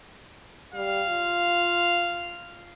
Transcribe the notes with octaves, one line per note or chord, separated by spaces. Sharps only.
G3 F5
F4